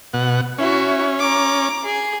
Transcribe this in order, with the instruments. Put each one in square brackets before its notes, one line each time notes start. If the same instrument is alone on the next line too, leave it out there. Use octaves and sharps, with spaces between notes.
[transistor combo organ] B2 F#5
[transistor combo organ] C#4 [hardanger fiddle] E4 F#4
[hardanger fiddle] A#5 D6
G#4